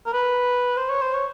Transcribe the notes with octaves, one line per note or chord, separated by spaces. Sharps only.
A#4
B4
C5
C#5
C5
C#5